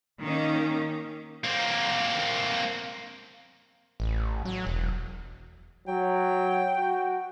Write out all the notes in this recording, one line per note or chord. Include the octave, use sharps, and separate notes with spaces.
D#3 A#3 C#4 D#4
A#3 C4
A1
F#3
E1
F#3 G5
F#4